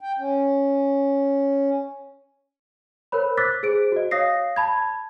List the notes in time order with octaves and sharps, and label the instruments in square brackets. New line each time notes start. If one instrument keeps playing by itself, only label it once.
[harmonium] G5
C#4
[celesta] A#4 C5 C#5 B5
D6 E6 F#6 A6 B6
G#4 C5 D7
F#4 D#5
C#5 F5 D#6 A#6 C7
A5 B5 G#6